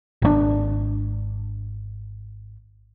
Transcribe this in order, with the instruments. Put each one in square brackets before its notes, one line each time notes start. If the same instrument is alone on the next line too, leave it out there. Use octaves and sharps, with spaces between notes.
[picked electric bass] G#1 C3 D4